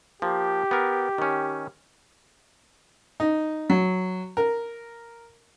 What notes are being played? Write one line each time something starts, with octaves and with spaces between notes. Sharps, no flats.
F3 A#3 G4
B3 A#4
D#3 C#4
D#4
F#3
A#4